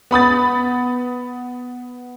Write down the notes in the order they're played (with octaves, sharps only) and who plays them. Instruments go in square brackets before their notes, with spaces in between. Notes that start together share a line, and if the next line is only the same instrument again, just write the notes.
[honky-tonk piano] B3 B5 D#6 A6